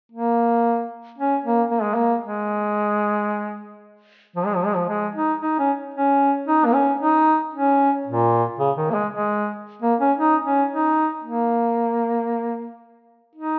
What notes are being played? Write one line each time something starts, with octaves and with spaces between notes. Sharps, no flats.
A#3
C#4
A#3
A#3
G#3
A#3
G#3
F3
G#3
F3
G#3
F3
G#3
D#4
D#4
C#4
C#4
D#4
A#3
C#4
D#4
C#4
A#2
C#3
D#3
A#3
G#3
G#3
A#3
C#4
D#4
C#4
D#4
A#3
D#4